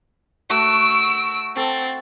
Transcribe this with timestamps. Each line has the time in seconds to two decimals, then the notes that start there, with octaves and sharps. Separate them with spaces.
0.50 A3 F#4 E6 D7
1.57 C4 A4